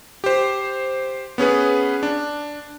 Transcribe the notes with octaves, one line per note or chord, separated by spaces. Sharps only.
G4 C5
B3 C#4 G#4 B4
D4